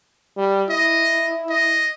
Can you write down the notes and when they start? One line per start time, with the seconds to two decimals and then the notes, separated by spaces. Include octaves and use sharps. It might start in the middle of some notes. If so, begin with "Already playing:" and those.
0.37 G3
0.69 E4 D#5
1.49 D#5